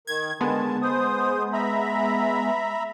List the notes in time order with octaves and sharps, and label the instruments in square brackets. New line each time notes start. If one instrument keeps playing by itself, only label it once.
[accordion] D#3 [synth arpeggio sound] G#6
[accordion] D3 D#3 A5 [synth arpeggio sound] G#3 B3
[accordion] C5 D#6
E5 A#5 B5